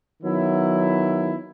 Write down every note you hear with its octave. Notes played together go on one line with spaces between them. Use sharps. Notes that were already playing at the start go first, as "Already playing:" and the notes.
D#3 F#3 B3 E4